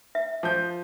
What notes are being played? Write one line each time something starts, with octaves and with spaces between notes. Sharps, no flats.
E5
F3 G6